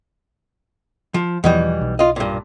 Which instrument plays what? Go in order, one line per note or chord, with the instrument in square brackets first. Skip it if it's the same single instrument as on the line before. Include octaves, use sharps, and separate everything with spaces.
[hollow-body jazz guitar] F3
[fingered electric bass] E2 F3 [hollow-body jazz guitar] B2 E3 G3
[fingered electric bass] B1
[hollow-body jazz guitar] F4 D#5
G2 A#2